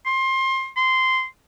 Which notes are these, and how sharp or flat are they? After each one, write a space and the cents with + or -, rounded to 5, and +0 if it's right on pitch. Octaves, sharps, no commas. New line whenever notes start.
C6 +25
C6 -10